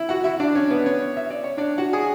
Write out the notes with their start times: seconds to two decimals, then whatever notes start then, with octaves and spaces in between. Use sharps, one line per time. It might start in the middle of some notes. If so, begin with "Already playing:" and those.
Already playing: E4 E5
0.09 F#4 F#5
0.24 E4 E5
0.40 D4 D5
0.55 C#4 C#5
0.70 B3 B4
0.86 C#4 C#5
1.17 E5
1.30 D5
1.44 C#5
1.57 D4 D5
1.78 F#4 F#5
1.93 G#4 G#5